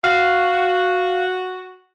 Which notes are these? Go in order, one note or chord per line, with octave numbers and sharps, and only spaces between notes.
F#4 F5